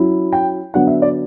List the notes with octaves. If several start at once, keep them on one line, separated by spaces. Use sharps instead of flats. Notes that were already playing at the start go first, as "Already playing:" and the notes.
Already playing: F#3 C#4 E4
G5
D3 F#3 B3 D4 F#5
E5
D5